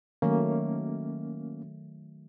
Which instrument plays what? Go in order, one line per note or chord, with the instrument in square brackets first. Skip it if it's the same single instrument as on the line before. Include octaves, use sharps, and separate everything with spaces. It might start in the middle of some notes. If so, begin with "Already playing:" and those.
[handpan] D#3 F#3 A3 [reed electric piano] A#3 C#4